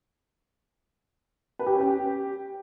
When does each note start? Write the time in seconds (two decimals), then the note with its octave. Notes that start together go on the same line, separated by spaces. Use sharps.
1.59 B4
1.66 G4
1.74 C#4
1.81 G4